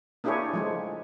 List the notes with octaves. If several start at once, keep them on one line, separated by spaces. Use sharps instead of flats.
A#3 D4 E4 G4 G#4 C#5
F3 G#3 A3